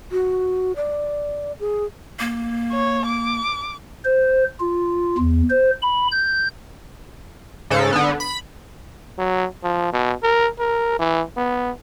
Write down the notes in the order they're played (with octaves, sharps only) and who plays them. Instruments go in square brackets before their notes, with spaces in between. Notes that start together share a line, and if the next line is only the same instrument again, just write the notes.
[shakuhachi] F#4
D5
G#4
[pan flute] A#3
[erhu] C#5
D6
[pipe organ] C5
F4
E2
C5
B5
G6
[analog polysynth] G#2 C#3 A4
D3 B3
B5
[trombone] F#3
F3
B2
A#4
A#4
E3
B3